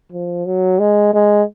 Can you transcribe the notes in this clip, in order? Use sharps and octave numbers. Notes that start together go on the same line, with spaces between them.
F3
F#3
G#3
G#3